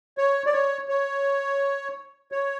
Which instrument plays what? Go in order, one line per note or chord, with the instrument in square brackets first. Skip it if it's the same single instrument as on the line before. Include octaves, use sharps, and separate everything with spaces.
[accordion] C#5
D5
C#5
C#5
C#5